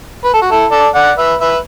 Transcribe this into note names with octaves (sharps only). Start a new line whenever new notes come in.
B4
A4
F#4
E4 A4
A4 D5
D5 F#5
B4 E5
B4 E5